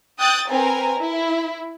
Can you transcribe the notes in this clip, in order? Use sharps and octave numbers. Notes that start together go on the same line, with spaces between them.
G5 D#6 F#6 G6 A6
C4 A#4 B4 G#5
E4